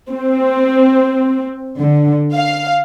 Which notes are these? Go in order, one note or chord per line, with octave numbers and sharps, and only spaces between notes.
C4
D3
F5